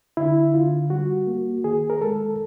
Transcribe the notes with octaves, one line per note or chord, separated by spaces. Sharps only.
D3 E4
D3 F4
G3 F#4
A#3
D#3 G#4
A#4
G#3 A4